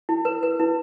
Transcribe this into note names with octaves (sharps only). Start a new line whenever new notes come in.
E4
B4
B4
E4